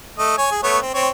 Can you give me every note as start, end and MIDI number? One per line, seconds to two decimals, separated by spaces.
0.18 0.36 57
0.18 0.36 75
0.38 0.51 73
0.38 0.51 80
0.51 0.62 68
0.63 0.78 57
0.63 0.78 59
0.63 0.78 73
0.82 0.90 60
0.94 1.08 60
0.94 1.08 73